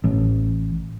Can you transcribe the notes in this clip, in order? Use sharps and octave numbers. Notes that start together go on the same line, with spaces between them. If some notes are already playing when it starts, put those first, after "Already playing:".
A1